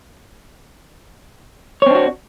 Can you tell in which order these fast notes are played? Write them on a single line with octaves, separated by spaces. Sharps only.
C#5 C4 D4 F#4